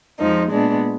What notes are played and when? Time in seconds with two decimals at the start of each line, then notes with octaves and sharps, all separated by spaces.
0.19 F2 F3 G#3 D#4
0.50 A#2 G#3 B3 D4